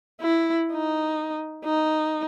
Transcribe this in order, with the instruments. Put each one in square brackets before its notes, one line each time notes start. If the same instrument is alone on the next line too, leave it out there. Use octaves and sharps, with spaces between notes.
[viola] E4
D#4
D#4